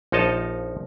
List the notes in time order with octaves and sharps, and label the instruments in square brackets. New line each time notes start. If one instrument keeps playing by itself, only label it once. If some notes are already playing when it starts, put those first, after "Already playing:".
[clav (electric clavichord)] A#1 F3 D#4 C#5 D#5 A5